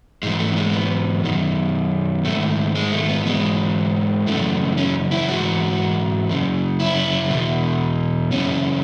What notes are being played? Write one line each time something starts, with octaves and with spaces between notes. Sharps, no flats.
G#2 E3 G#3
A3
G#3
B3
F#2 D#3
G#2 D#3 A3
G#3
A3
B3
G#2 E3 G#3
F#2 C#3 E3 A3
C#4
E4
G#2 E3 F#4
F#2 C#3
E4
E2 B2
F#2 C#3 E3 C#4